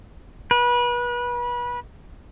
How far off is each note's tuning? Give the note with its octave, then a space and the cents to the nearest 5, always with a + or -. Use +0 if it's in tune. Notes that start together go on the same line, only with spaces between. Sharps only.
B4 -30